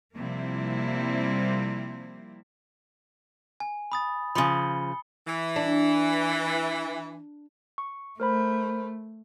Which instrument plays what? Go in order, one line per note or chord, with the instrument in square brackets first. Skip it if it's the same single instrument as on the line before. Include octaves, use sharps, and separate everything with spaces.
[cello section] C3 F3 G3 A#3 C4 E4
[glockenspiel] G#5
B5 D#6 A6
[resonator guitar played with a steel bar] C#3 F3 [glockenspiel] B5 C#7 G7
[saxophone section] E3
[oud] D4
[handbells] C#6
[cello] A3 [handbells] A#4 C5 B5